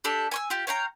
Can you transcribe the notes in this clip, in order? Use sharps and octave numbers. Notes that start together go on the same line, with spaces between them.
D4 G4 A4
G#5 C#6 E6
F4 G4
C#5 F5 G5 A#5